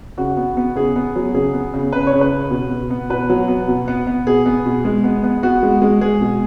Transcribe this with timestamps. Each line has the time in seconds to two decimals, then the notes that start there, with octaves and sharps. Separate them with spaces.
0.18 C#3 F#4
0.37 B3
0.57 B3
0.76 C#3 G#4
0.96 B3
1.16 F#3
1.35 C#3 G#4
1.53 B3
1.74 C#3
1.93 C#3 B4
2.07 C#5
2.13 C#3
2.21 B4
2.32 C#3
2.51 B2
2.70 B2
2.90 B3
3.10 B2 B4
3.30 F#3
3.48 B3
3.68 B2
3.88 B3
4.07 B3
4.27 B2 G#4
4.46 B3
4.66 B2
4.85 G#3
5.04 B3
5.24 B3
5.43 B3 F#4
5.63 G#3
5.82 G#3
6.01 G#3 G#4
6.21 B2